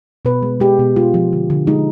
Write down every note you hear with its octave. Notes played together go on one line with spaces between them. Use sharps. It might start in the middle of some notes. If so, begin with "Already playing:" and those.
B2 B4
G#3
G#3 G4
B2
G#3 F4
F3
D3
D3
G#3 D#4